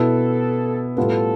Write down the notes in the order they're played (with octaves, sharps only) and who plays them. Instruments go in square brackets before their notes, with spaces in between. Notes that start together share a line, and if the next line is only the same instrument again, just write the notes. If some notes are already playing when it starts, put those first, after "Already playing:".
Already playing: [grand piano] B2 B3 E4 B4 [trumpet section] A4
[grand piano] A2 G3 B3 F4 B4 [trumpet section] A4